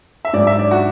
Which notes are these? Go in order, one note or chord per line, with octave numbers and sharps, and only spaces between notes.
E5
G#2 F#3 D5
E5
D5
F#4